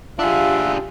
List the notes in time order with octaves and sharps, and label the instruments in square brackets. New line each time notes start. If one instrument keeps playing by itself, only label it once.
[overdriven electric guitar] D4 G#4 [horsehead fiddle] F4 G4 [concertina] E5 F#5